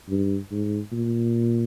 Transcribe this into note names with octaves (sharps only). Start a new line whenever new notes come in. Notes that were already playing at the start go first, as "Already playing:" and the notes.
G2
G#2
A#2